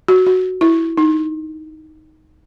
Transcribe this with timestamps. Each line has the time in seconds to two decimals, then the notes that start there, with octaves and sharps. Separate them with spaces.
0.08 F#4
0.27 F#4
0.61 E4
0.97 D#4